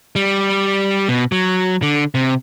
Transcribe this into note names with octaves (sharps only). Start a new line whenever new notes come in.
G3
B2
F#3
D3
C3